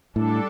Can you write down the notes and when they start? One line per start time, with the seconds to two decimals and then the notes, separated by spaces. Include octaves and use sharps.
0.16 A2 G3 D4 A4